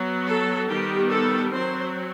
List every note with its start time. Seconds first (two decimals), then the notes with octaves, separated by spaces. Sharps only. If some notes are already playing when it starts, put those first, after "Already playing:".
Already playing: F#3 B3
0.26 A4
0.68 D#3 G3 B3 G4
1.10 A4
1.52 F#3 C4 C5